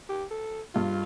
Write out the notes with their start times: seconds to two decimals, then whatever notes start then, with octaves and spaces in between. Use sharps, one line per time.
0.09 G4
0.31 A4
0.75 G2 F4